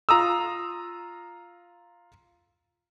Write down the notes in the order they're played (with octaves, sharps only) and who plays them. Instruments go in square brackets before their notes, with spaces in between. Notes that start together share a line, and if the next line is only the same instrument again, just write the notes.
[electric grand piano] F4 A#5 D#6 E6